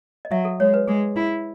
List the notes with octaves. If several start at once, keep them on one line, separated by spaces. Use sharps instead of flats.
D#5
F#3 E5
A4
G#3 C#5
B4
G#3 G#4
E4